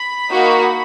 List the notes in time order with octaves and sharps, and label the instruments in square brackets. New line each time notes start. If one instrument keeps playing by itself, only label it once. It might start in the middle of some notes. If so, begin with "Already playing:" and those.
Already playing: [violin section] B5
A#3 D#4 F#4